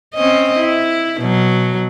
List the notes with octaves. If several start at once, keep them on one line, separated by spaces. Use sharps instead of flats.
C4 C#4 D#5
E4
B2 F#3